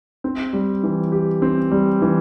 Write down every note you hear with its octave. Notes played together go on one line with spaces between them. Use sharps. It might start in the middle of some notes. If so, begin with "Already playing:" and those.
C4
G3
E3
G4
C4
G3
E3